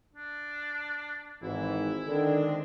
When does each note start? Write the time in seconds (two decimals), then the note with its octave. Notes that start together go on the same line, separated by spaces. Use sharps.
0.14 D4
1.42 G#1 E3 E4
2.07 D3 D#3 G#3 C4 D4